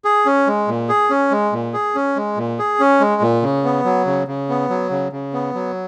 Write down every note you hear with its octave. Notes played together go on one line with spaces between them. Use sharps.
G#4
C#4
G#3
A#2
G#4
C#4
G#3
A#2
G#4
C#4
G#3
A#2
G#4
C#4
G#3
A#2
C#3
B3
F#3
C#3
C#3
B3
F#3
C#3
C#3
B3
F#3